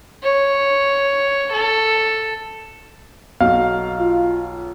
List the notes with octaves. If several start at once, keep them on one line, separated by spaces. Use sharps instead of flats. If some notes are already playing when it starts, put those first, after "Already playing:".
C#5
A4
B1 D#4 F#4 F5
F4